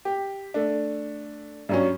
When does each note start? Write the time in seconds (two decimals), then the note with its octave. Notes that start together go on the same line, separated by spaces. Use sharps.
0.05 G4
0.54 A3 D4
1.69 G2 F#3 C#4